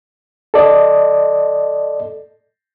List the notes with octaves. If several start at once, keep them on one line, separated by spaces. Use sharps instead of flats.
A4 D5 D#5